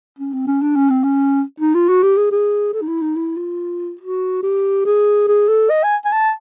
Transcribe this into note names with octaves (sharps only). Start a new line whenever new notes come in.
C#4
C4
C#4
D4
C#4
C4
C#4
D#4
F4
F#4
G4
G#4
G#4
A4
D#4
E4
D#4
E4
F4
F#4
G4
G#4
G#4
A4
D#5
G#5
G#5
A5